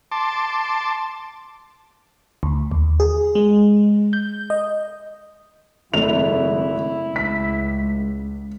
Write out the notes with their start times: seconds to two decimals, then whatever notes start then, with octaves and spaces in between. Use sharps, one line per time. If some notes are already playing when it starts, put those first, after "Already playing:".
0.12 A5 C6 D6
2.43 D2
2.71 D#2
3.00 G#4
3.35 G#3
4.13 G6
4.50 D#5
5.94 G#1 F#2 C#3 A3 E4 F7
7.16 C#2 B6